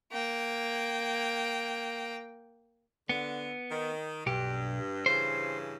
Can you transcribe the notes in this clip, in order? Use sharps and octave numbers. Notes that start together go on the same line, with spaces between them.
A#3 G5
D3 B3
D#3
B1 G2 G4
G2 C#3 E3 C5